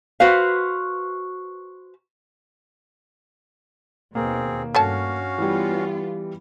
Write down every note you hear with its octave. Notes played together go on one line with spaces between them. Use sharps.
F#4 B4 C5 F5
D#2 B2 A#3 C4 G#4
G2 A3 C#4 F#4 C#5 F5 A5
E3 G3 B3 F4